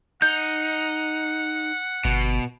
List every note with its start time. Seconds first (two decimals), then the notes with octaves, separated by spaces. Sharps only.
0.22 D#4 F#5 G6
2.05 G1 B2